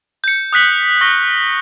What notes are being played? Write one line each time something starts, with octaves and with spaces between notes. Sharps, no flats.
G6 C#7
D#6 F#6 B6 F#7
C#6 F6 A#6 G7